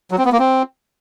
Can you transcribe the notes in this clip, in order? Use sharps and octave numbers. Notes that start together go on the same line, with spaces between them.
F#3
C4
B3
A#3
C4